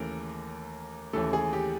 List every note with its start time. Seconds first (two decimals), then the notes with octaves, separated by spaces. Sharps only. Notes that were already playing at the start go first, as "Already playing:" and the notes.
Already playing: D#2 C#3 E3 A3 A#4
1.13 D#2 C#3 E3 A3 A4
1.33 G#4
1.53 G4